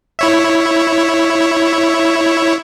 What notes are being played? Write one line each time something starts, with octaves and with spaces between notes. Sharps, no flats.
E4 C#5 E5